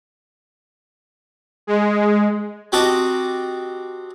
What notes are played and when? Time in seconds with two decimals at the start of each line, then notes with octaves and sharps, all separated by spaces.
1.67 G#3
2.72 C4 F#4 G4 D#5 G5 A5